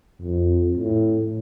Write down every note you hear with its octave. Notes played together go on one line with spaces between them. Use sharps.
F2
A2